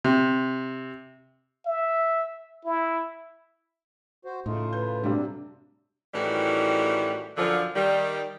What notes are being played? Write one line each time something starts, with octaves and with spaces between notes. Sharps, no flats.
C3
E5
E4
F#4 C5
A2 C#3 A3 D#4 F4
B4 G6
C3 F#3 G3 D4
A2 D#3 E3 G3 C#4 F#4
F#2 D3 F3
D#3 G3